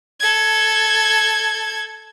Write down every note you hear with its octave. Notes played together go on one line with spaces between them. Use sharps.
A4 G#6